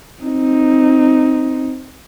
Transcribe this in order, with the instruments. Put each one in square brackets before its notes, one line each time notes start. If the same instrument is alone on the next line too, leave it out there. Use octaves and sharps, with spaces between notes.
[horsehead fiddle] C4 D#4